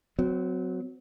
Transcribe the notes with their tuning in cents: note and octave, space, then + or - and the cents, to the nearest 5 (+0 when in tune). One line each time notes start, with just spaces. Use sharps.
F#3 -5 C4 -35